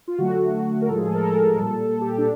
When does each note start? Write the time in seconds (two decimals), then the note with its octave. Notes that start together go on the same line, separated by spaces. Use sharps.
0.08 F4
0.18 D3 F#3 A3 F#4
0.82 A#4
0.88 A2 F3 G#3 A4
0.97 G#4
1.06 A4
1.15 A#4
1.23 A4
1.57 A#2 G3
2.01 G4
2.18 D4